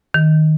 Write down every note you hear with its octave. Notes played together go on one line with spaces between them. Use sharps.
D#3